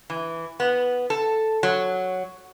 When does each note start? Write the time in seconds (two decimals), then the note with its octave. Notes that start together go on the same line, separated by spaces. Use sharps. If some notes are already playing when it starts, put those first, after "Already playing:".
0.10 E3
0.60 B3
1.10 A4
1.63 F#3